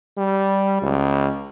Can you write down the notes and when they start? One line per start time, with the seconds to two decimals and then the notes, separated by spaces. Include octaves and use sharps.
0.18 G3
0.82 C#2